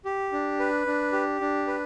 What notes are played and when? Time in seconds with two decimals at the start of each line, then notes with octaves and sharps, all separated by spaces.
0.05 G4
0.32 D4
0.59 B4
0.86 D4
1.13 G4
1.41 D4
1.67 B4